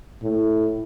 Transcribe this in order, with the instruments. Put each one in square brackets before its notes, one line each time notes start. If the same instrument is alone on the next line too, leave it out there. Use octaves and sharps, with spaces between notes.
[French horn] A2